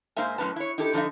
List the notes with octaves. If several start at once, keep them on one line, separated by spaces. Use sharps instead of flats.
G#2 A#3 D#4 C5 E5 G#5
F#2 A2 C#4 B4 A5
E4 C#5
D#4 E4 G4 A4
D3 F3 F#3 D#4 D#5 E5